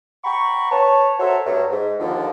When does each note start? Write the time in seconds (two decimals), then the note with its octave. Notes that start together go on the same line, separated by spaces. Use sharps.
0.24 F#5 G5 A#5 B5 C#6
0.71 B4 C#5 A5
1.20 F#4 A4 A#4 C5 C#5 E5
1.46 G2 F#3 A3
1.71 G#2
2.00 D#2 D3 F3